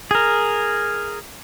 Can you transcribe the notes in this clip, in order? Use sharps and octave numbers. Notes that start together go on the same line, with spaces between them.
G#4 A#4